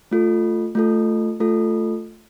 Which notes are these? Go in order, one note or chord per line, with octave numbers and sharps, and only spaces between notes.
A3 F4 A4
A3 F4 A4
A3 F4 A4